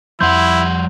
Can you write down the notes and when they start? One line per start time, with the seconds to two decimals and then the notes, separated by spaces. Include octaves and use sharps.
0.21 F2 F3 G3 E4 F#5 C6 G6